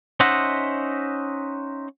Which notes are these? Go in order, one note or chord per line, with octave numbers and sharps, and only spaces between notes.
C#4 D#4 C5 D#5 E5 F#5